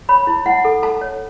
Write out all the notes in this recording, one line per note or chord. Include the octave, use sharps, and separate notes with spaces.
C#5 B5
E4
E4 F#5
A4
A4 A5
C#5